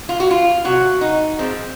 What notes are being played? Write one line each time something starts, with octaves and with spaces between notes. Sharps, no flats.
F4
F#4
F4
C3 F#3 F#4
D#4
A#2 F3 G#3 C4